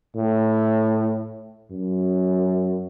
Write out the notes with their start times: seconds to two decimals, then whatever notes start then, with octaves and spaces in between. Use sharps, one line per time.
0.16 A2
1.72 F#2